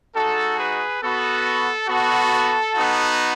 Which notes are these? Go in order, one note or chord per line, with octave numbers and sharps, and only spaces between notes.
G#3 D#4 F#4 A4
G#4 B4
B3 F#4 A4
B3 F#4 A4
B3 D#4 F#4